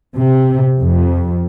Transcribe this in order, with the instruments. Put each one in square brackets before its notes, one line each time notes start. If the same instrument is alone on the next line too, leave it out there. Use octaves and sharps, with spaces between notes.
[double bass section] C3
F2